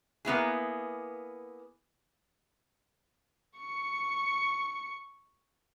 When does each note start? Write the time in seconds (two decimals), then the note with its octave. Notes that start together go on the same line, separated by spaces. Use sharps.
0.25 A#3 B3 E4 G#4
3.58 C#6 C#7